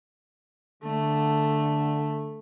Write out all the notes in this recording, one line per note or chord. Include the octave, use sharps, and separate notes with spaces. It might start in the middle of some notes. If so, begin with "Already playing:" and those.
D3 A3